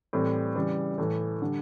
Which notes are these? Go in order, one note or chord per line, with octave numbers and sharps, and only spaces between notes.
A2 E3 G3 C4
C#3 E3 G3
A2 E3 A3
D3 G3